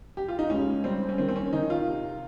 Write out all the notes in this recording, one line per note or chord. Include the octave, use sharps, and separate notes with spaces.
G4
F4
D#4
C#2 C#4
G3 C4
C#4
D#3 C4
C4
C#4
D#3 D#4
F4
C3